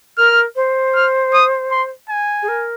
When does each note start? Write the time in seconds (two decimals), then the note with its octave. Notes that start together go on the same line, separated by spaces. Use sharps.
0.18 A#4 F6
0.56 C5
0.95 F6
1.33 D#6
1.71 C6
2.09 G#5
2.42 G#4
2.48 A#4